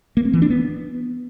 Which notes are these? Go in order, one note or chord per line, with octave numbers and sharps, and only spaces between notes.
A#3
C4
E3
D4
B3